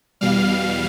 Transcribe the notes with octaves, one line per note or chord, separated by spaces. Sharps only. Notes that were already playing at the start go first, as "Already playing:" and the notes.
E2 B2 G3 F5 F6